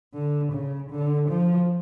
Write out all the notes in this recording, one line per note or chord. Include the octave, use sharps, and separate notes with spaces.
D3
C#3
D3
F3